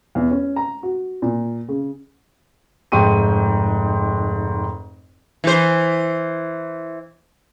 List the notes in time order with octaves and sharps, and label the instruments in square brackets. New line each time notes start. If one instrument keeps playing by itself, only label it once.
[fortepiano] E2
C#4
A#5
F#4
A#2
C#3
[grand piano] F1 G#2 G5 C#6 D#7
[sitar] E3 C5